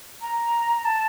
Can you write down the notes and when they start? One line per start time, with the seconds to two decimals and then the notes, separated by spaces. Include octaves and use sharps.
0.21 A#5
0.85 A5